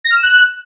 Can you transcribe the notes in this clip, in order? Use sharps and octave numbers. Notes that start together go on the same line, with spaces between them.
A#6
F6
E7
F#6